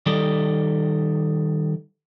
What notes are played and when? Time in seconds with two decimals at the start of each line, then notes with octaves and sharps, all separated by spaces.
0.06 D#3 G3 A4 D5 D#5